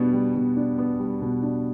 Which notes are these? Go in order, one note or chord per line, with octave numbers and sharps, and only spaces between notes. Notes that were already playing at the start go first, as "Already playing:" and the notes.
Already playing: B2 G3 B3 D4
G3
B2
D4
B3
G3
B2
D4